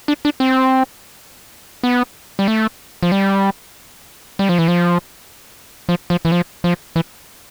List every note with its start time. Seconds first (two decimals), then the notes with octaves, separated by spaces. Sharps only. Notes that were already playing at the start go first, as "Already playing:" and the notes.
0.08 D4
0.25 D4
0.40 C4
1.84 B3
2.39 G3
2.48 A3
3.03 F3
3.12 G3
4.39 G3
4.49 F3
4.58 E3
4.68 F3
5.89 F3
6.10 F3
6.25 E3
6.32 F3
6.64 F3
6.96 E3